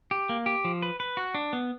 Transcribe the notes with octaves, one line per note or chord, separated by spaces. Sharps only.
G4
A#3
G4
F3
B4
B4
F#4
D4
B3